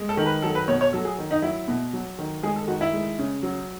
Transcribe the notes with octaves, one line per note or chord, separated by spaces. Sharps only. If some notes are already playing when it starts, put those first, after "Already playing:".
Already playing: G#3
A4
D#3
B4
F#3 A4
B4
B2 C#5
C#5
F#3 A4
G#4
D#3
D#4
F#3 E4
B2
F#3
D#3
G#3 G#4
A4
D#3 F#4
E4
G#3
C#3
F#3